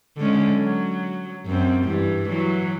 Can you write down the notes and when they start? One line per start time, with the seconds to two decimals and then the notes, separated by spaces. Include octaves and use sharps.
0.17 D3 G#3 C#4
0.53 F#3
1.46 F#2 C4
1.85 G2 E3
2.29 E3 F#3